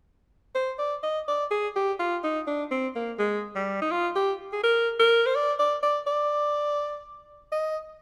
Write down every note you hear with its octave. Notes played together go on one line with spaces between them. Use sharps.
C5
D5
D#5
D5
G#4
G4
F4
D#4
D4
C4
A#3
G#3
G3
D#4
F4
G4
G#4
A#4
A#4
C5
D5
D5
D5
D5
D#5